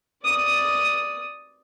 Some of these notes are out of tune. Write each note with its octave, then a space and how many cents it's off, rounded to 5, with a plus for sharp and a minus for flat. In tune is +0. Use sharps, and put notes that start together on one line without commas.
D5 +0 D#6 +0